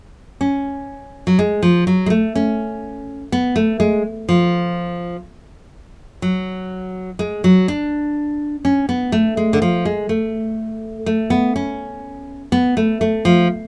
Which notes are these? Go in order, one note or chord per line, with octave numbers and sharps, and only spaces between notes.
C#4
F#3
G#3
F3
F#3
G#3
A3
C#4
B3
A3
G#3
F3
F#3
G#3
F#3
D4
C#4
B3
A3
G#3
D3
F3
G#3
A3
A3
B3
C#4
B3
A3
A3
F3